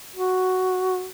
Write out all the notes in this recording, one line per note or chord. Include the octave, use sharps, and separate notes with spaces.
F#4